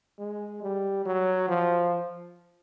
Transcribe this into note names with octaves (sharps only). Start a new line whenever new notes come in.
G#3
G3
F#3
F3